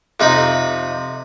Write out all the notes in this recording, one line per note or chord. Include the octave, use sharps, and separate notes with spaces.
F2 C3 D#4 B5